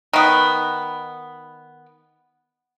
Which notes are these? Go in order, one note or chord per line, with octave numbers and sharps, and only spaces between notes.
D#3 B3